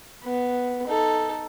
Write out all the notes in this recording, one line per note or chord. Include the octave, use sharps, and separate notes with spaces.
B3
D#4 A4